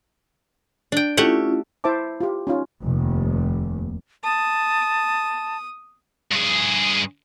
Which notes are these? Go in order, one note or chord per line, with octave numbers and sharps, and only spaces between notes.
D4 G5
A3 C#4 E4 F4 G4 F#5
E4 C5 E5 A5 D6
F4 G4
C#4 D#4 F4
F1 D#2
A5 D#6
G2 G#4